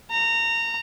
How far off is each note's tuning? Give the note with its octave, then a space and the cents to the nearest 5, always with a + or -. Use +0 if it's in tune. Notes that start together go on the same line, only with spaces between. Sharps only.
A#5 -20